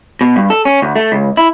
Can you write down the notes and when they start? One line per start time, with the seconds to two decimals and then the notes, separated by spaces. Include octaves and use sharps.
0.21 B2
0.36 G2
0.50 A4
0.65 C#4
0.82 D2
0.96 A3
1.12 C#2
1.37 E4